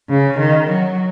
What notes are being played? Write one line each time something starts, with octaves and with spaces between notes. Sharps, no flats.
C#3
D#3
F#3